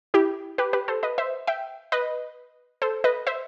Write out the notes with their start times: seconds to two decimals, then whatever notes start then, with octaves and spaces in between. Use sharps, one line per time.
0.14 E4 G4
0.58 G4 B4
0.73 G4 B4
0.88 A4 C5
1.03 B4 D#5
1.18 C5 E5
1.47 E5 G5
1.92 B4 D#5
2.82 A4 C5
3.04 B4 D#5
3.27 C5 E5